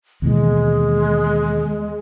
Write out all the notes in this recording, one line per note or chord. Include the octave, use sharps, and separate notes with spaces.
D#2 B2 E3 G#3